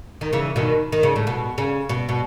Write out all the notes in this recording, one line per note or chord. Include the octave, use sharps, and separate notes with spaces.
D#3
C#3 E3
B2 D#3
D#3
C#3
A2
B2
C#3
B2
B2